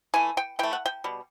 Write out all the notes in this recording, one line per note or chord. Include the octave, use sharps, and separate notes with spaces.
E3 A3 G#5
G5
E3 A3 G5
F#5
G5
B2 G3